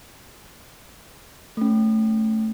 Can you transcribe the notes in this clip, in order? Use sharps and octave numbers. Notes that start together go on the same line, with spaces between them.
A3 C#4